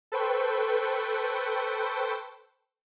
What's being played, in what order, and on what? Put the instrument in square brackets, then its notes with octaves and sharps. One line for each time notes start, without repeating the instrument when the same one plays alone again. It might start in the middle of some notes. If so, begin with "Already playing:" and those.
[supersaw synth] A4 B4 C5 G5 C#6